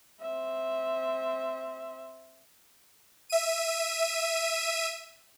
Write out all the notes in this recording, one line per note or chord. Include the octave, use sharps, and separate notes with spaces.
C4 E5
E5 D#7